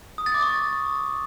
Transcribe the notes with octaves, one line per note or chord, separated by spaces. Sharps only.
D#6
A6
D6
C#6